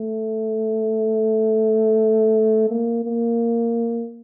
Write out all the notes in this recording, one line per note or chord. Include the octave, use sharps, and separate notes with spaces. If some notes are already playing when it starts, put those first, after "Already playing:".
Already playing: A3
A#3
A#3